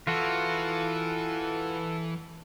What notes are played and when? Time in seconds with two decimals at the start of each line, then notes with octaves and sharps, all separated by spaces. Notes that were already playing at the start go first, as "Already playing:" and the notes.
0.07 E3 F4 F#4 A4